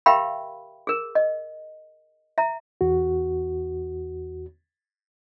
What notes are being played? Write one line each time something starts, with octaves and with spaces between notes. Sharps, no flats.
G4 A#4 E5 F5 G5 B5
G#4 A#4
D#5
E5 A#5
E2 F#4